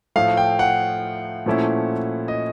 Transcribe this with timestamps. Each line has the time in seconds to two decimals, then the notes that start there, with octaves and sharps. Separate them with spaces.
0.16 A2 F3 A3 F5
0.37 G5
0.59 F#5
1.46 A#2 F3 A3 C#4 E4
2.28 D#5